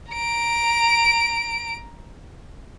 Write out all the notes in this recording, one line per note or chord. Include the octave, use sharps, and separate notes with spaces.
A#5 D7